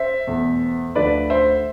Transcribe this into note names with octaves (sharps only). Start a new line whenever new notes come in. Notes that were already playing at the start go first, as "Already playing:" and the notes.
Already playing: C5 E5
E2 B2 A3
D2 D3 F3 A3 B4 D5
C5 E5